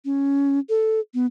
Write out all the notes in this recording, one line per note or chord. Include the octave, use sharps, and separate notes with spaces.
C#4
A4
B3